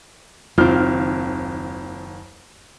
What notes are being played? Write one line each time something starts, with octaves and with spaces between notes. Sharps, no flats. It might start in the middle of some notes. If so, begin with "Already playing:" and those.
F#1 D#2 C4 F4 F6